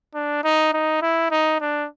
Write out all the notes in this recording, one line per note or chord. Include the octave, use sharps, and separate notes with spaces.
D4
D#4
D#4
E4
D#4
D4